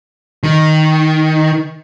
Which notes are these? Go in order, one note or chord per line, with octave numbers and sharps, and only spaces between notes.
D#3